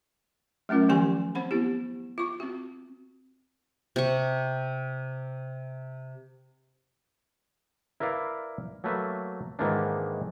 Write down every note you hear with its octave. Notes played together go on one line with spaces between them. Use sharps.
F#3 A3 C#4 F4 A#4
D#3 F3 A#3 G4 G#5 C6
C4 C5 F#5 B5
B3 E4 G4
F4 C#6
C4 F#4
C3 C#6
E4 A#4 B4 D5 F5
F#3 A3 A#3 B4 E5
G#2 D#3 E3 A#3 D4